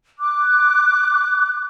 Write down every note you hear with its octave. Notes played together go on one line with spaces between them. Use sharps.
D6 F#6